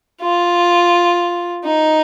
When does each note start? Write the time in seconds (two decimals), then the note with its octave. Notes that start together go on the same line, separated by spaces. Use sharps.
0.21 F4
1.64 D#4